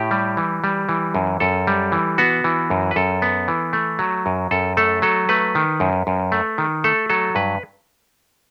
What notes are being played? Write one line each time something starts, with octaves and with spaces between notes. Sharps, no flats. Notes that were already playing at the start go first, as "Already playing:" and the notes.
Already playing: A2 G4
G3
E3
G3
E3
F#2
F#2 A4
G3
E3
B3 F#4
E3
F#2
B4
F#2 A4
B3
E3
A3
F#3
F#2
F#2 A4
A3 A4
F#3 A4
A3 B4
D#3
F#2
F#2
A3
D#3
A3 A4
F#3 A4
G2 B4